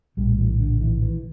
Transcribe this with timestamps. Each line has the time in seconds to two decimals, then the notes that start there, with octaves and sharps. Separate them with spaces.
0.17 A#1 A2 G3
0.38 E3
0.60 D3
0.81 E3
1.02 E3